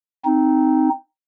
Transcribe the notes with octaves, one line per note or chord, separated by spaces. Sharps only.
C4 D#4